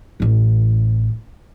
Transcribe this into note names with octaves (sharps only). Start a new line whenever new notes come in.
A1 E3